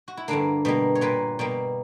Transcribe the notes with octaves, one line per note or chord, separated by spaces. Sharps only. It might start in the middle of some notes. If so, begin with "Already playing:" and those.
F#4
E4
G2 D3 A#3 D4
B2 G3 A#3
C#5
A#2 A#3 B4
B2 G3 A#3